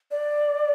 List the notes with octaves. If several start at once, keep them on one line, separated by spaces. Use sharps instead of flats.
D5